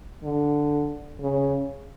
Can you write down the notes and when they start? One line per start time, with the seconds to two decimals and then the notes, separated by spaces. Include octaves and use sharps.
0.24 D3
1.20 C#3